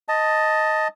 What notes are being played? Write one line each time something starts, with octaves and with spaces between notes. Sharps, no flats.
D#5 A5